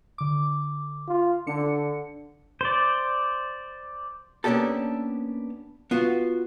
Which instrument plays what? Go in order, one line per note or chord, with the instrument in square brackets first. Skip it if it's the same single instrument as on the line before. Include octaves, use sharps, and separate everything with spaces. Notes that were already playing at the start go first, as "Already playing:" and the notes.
[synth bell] D3 D6
[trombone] F4
[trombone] D3 [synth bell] D4 C#7
[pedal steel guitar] C5 D5
[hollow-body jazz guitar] A#3 B3 C#4 D4 G4 A4
B3 F4 F#4